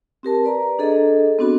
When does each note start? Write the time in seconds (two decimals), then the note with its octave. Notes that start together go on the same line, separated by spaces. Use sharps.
0.23 C4 G4 A#4 A5
0.44 B4 D5 A#5
0.79 D4 G#4 A4 D#5
1.39 B3 C4 D4 F#4 B5